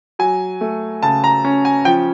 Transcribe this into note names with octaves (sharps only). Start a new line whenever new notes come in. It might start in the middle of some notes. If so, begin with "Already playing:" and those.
F#3 G#5
A3
C#3 A5
A#5
C#4
G#5
F3 G5